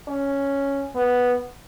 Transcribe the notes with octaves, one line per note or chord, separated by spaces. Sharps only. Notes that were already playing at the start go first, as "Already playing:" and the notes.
C#4
B3